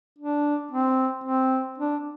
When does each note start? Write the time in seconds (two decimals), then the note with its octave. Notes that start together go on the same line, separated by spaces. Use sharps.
0.19 D4
0.71 C4
1.24 C4
1.78 D4